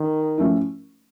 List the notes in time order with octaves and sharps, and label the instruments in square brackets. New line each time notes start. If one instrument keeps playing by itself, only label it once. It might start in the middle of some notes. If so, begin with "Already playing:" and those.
Already playing: [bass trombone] D#3
[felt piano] F3 A3 C#4 E4